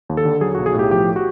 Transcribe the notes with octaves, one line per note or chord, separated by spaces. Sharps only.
D#2
A4
D3
F#3 G#4
F#4
B1
G#4
A2 G4
F3 G4
F#4